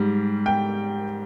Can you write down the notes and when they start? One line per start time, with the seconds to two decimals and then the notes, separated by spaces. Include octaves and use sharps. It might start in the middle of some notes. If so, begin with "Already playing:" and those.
Already playing: G#2 G3
0.46 G5